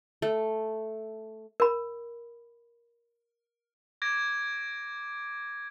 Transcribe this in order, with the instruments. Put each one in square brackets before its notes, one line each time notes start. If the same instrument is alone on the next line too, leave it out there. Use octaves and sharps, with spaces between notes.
[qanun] A3
[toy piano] A#4 B5
[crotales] D6 G#6 A#6 D7